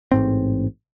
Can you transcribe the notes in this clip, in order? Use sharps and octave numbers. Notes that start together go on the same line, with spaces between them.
A1 G#2 C4